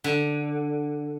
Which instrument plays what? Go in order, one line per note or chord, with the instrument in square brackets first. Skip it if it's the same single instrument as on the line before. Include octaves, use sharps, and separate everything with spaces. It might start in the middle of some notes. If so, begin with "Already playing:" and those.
[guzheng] D3